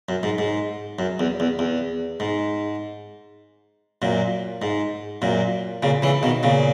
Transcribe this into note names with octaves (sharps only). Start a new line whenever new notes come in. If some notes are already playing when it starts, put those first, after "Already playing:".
F#2
G#2
G#2
F#2
E2
E2
E2
G#2
F#2 A#2
G#2
F#2 A#2
A#2 C#3
C#3 E3
B2 D#3
A#2 C#3